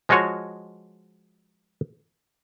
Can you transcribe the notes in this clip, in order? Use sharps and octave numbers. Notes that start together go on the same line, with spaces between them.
F3 G#3 F4 F#4 C#5 D#5